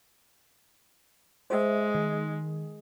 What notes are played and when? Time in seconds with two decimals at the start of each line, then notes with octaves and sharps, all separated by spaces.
1.50 G#3 C5 E5
1.95 D#3